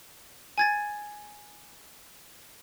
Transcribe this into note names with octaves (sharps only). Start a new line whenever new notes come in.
G#5 G#6 A6